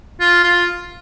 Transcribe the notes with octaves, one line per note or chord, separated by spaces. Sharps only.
F4
F4